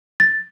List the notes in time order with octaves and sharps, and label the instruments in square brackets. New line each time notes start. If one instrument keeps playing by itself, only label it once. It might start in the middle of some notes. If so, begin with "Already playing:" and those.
[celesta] A6